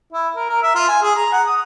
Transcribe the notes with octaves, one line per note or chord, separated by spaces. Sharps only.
E4
A#4
A#4
E5
F4
G#5
G#4
A#5
F#5
D#6